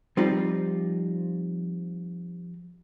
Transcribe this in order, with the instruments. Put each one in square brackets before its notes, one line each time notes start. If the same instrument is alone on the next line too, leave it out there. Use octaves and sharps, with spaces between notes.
[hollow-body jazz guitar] F3 G3 C4 D#4 F4